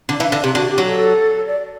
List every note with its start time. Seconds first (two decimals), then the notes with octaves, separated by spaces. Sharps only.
0.09 D3 D4
0.19 E3 E4
0.28 D3 D4
0.44 C3
0.55 D3 F#4
0.70 G4
0.78 F#3
0.85 A4
1.46 D5